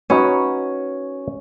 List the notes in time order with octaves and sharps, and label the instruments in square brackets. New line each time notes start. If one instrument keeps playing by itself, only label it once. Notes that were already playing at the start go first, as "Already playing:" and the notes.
[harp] C#4 [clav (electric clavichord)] D#4 F#4 B4